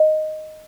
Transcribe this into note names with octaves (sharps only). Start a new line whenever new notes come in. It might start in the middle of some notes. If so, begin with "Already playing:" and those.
Already playing: D#5